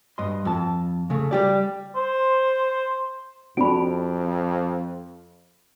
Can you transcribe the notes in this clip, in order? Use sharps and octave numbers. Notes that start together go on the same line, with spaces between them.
G2 D#5 C6
F2 A5
C#3 A3
G3 G4 D5
C5
F2 C4 D4 F#4 B5 D7